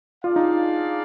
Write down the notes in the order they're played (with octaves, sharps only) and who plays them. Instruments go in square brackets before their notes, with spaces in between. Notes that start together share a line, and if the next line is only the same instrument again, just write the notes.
[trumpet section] D4 G#4 D5 F5 [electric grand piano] F4
[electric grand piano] D#4